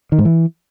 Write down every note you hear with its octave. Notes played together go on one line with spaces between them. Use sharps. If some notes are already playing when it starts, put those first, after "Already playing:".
D#3
G#2
E3